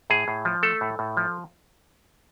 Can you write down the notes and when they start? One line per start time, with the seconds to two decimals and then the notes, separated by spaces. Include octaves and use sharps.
0.10 A2 G#4
0.28 A2
0.45 F3
0.63 A3 A4
0.81 A2
0.99 A2
1.17 F3